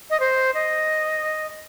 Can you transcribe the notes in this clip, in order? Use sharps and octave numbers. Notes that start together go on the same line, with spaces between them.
D#5
C5
D#5